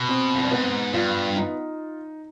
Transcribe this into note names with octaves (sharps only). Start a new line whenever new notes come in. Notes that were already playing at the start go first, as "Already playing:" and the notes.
Already playing: B2
C4
F2
G2
G#2 B3
G2 F4
D#4